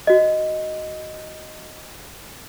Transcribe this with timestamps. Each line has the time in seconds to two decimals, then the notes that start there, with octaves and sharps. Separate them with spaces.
0.07 F#4 D#5